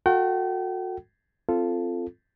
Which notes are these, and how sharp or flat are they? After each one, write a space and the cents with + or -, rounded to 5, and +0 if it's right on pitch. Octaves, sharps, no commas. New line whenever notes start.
F#4 -30 A4 +15 G5 -35
C4 +0 F4 -10 A4 +0